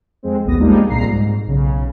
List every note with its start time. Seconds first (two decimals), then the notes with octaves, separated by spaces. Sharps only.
0.23 F2 G#3 C4
0.44 A1 D#2 B3 D#6 A#6
0.59 F3 G3 G#3 A#3 D4 D#4
0.90 C2 A#2 A#5 C7
1.05 G#2
1.46 B1 C#3